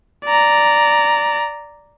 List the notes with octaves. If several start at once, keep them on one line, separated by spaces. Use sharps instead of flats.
D5 A#5